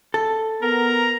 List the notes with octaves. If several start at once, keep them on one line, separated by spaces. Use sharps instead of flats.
A4
B3 A#4 A#5